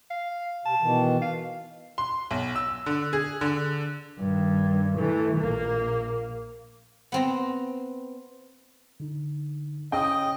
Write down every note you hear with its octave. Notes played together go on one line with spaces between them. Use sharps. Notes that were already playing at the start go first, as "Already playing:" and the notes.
F5
C3 A5
B2 D#3 E3
F5
C6
B1
E6
D3
G#4
D3
G2 D#3
E3 A3
A#1 A#3
B3 C4 A#5
D3 D#4
C#3 C#4 D#5 G5 D#6